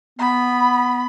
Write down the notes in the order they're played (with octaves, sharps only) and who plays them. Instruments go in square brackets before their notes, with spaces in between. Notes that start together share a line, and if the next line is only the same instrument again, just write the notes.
[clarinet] B3 [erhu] B5